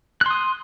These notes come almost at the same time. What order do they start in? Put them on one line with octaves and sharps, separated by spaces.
F#6 C6 D#6